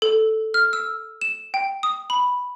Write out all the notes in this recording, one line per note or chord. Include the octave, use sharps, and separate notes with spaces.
A4
F6
E6
E7
G5
D#6
B5